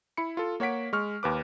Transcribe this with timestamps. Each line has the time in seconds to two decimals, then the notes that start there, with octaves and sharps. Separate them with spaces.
0.17 E4 B5 C#7
0.37 F4 A4
0.60 A#3 C#5 F#5 B6 D7
0.93 G#3 C#6 F6
1.23 D#2 B4 D6